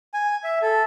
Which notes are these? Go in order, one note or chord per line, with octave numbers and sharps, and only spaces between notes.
G#5
E5
A4